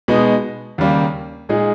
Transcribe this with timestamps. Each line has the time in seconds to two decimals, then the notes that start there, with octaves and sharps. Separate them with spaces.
0.08 B2 G#3 B3 D#4
0.78 D#2 C#3 G3 A#3
1.49 A#2 G#3 D#4 G#4